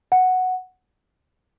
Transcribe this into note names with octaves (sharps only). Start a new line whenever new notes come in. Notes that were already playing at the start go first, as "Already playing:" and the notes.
F#5